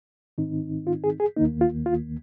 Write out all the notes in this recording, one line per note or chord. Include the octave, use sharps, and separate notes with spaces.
G#2 D#3 C4 D#4
F4
G#4
G#4
D#2 D#3 A#3 D#4
F4
F4